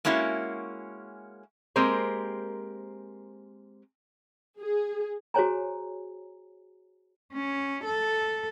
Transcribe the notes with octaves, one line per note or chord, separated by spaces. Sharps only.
G#3 A#3 C#4 E4 F#4
G#3 A#3 C4 G4 A#4 C5
G#4
F#4 G#4 C5 C#5 G#5 A#5
C#4
A4